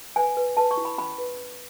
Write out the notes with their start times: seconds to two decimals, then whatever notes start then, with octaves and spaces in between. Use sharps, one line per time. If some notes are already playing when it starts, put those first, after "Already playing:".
0.16 B4 G#5
0.37 B4
0.57 B4 A5
0.71 C#6
0.77 E4
0.85 B5
0.98 C#4 B5
1.18 B4